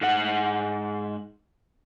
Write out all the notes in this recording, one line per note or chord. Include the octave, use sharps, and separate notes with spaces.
G#2 F#5